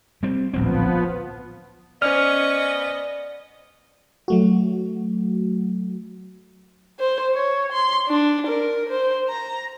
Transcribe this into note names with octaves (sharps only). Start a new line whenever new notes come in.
G3 C4
D1 A#1 F3 B3 C4
B3 C#4 C5 D5 D#5 C#6 F6
F#3 A3 F#4
C5
C#5
C6
D4
A#4
C5
A#5